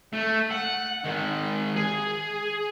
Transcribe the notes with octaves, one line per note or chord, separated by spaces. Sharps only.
A3
F#5
D#3 G#3
G#4